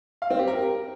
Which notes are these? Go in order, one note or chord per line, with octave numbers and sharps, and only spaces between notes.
F5
C4
G4
A#4